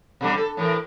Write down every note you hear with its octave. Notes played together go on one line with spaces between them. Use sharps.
B2 D3 G3
A4
A2 E3 A#4